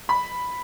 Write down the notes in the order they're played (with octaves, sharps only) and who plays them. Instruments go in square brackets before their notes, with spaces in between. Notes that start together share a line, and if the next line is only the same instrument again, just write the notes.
[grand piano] B5